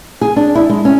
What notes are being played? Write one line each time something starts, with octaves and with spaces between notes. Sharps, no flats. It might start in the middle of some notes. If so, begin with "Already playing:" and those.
G#4
D4
E4
G#3
C#4